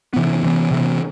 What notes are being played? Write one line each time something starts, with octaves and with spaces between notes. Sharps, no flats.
C3 E3 B3
C3 E3 B3
C3 E3 B3